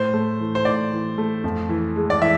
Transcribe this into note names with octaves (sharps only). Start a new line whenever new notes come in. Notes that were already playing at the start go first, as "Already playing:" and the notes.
Already playing: A2 C5
A3
E3
C5
A2 D5
E3
A3
F2
E3
G#3
D5
E3 E5